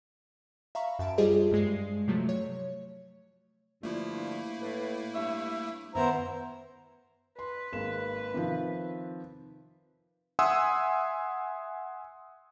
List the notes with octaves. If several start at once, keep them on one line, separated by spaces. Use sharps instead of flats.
E5 F5 A#5 B5 C#6
F#2 E5 A5 D7
G3 F4 G4 G#4 C5 D#5
G2 G#3 C7
C3 F3 F#3 A3
C#5
G2 D3 F3 A3 A#3 E4
A2 B4
G2 C#5 E5
F#2 D#3 B3 E4 C5 A#5
B4 C6
G#1 A#3 E7
C3 D#3 F3
E5 F#5 G#5 C6 D#6 E6